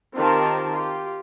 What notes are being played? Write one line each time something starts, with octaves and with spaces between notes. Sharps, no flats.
D#3 C4 F4 G4 A#4 A5
F4 G4